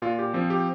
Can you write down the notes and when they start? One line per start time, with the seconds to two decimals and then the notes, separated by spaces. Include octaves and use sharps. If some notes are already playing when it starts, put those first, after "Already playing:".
0.02 A#2 F4
0.19 G4
0.34 F3 C4
0.50 G4